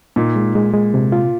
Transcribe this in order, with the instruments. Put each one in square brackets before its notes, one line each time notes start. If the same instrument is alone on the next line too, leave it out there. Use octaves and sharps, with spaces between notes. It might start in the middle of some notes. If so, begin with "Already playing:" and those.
[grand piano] A#2 [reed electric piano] D#4
[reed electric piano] G#3
G#3
G#3
C3
F4